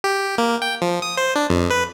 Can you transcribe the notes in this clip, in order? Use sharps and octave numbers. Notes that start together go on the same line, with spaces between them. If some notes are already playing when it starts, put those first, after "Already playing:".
G4
A#3
G5
F3
D#6
C5
D4
F2
B4